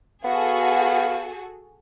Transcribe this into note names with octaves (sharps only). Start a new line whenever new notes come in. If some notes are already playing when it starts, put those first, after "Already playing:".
B3 F#4 G#4 A4 F5